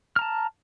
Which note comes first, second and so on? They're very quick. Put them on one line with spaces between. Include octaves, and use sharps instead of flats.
F6 A#5 A5